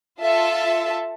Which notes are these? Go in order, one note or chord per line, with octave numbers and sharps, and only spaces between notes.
F4 A4 E5 A5